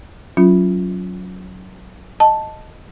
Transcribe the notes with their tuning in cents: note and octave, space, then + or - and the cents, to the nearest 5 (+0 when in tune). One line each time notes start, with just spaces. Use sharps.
F#3 +0 C#4 +5 F4 +0
D#5 +0 A5 +0